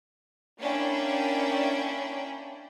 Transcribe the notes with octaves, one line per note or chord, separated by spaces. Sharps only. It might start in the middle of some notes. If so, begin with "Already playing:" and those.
A#3 C#4 D4 E4 D5 G5